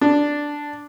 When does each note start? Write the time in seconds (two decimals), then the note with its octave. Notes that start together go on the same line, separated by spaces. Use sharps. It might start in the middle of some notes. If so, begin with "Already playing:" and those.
0.01 D4